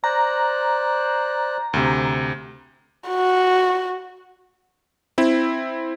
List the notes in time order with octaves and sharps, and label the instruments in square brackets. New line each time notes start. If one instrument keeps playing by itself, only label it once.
[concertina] C5 D5 F#6 [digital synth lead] A#5
[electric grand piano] D2 C3
[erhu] F#4
[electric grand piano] C4 E4